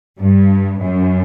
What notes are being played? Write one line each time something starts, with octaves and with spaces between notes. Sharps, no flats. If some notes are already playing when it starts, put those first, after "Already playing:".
G2
F#2